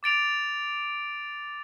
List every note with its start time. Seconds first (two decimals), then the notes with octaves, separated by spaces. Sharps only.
0.03 D6 A6 D7 F7